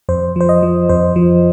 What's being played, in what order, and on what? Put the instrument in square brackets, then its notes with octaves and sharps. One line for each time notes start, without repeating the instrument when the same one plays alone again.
[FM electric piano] F2 C5
F3 C5
D#5
F3
F2 C5
F3